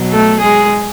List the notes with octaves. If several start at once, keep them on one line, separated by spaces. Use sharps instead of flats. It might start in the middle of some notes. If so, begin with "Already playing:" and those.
Already playing: B2 F#3
A3 A4
G#3 G#4